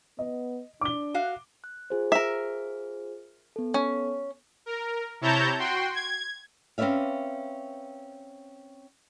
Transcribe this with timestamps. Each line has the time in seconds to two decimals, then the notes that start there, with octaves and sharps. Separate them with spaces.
0.19 B3 D#5
0.81 D4 D6 G7
1.14 F#4 F5
1.64 F#6
1.90 F4 G#4 C5
2.12 A#4 E5
3.56 B3 A4
3.74 C#4
4.66 A#4
5.21 C3 E4 C#5 A5 A#5 G6
5.59 F#4 G5 C6
5.94 G#6
6.78 C4 C#4 B4 D5 E5 F5